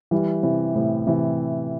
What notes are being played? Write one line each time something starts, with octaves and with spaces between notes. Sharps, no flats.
E3 G3
C3 E3
A2 C3
C3 E3